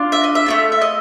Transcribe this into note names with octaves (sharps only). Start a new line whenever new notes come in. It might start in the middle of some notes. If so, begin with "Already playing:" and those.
Already playing: D4 F4
E5
D#5
E5
A3 C4 F4
E5
D#5